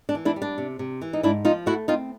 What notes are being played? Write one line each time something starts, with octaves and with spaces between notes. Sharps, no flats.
D4
E3
D4 E4
G3
D4
C3
C3
E3
D#4
G#2 D4 E4
F3 D#4 F4
A3 E4 F#4
C4 D#4 F4